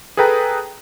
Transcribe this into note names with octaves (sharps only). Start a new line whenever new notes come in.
G#4 A4 B4 G5 A#5